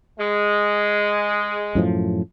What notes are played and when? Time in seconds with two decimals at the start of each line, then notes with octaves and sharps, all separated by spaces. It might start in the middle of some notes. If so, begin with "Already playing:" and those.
0.19 G#3
1.75 F#2 A2 F3